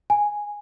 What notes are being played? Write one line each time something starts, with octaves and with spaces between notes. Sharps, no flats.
G#5